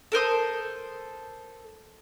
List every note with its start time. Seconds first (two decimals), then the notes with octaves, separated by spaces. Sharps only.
0.12 A4 A#4 C5 D#6